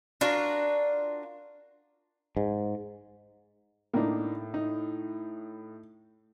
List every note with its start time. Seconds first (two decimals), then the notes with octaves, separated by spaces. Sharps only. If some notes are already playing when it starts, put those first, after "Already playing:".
0.21 D4 F4 F#4 A#4
2.37 G#2
3.94 A2 A#3 D4 D#4
4.54 D#4